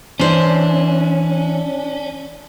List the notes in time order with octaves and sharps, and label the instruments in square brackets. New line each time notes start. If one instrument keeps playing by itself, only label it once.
[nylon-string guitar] E3 C5 [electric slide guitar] C#4 D4